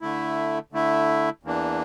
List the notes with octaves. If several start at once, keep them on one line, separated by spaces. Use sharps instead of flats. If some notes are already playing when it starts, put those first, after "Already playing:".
D3 A3 E4
D3 A3 E4
E2 E3 A#3 D4